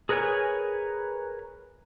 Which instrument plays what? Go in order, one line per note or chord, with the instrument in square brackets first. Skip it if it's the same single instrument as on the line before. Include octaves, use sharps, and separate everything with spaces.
[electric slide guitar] G#4 A#4 B4 C#5 G#5 A#5